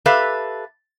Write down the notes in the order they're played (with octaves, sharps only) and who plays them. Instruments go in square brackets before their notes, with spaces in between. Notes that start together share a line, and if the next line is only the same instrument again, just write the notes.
[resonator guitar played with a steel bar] G4 A4 B4 E5 F5